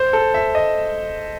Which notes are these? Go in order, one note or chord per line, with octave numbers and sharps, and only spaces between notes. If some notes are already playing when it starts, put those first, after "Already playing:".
Already playing: C5
A4
E5
D#5